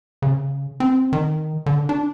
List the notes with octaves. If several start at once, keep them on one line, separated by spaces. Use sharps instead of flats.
C#3
C4
D#3
D3
D4